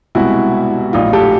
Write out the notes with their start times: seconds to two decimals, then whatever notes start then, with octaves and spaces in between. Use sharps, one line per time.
0.15 C2 B2 G#3 E4 F#4
0.93 A#1 A2 F#3 D#4 F4
1.13 G4 A4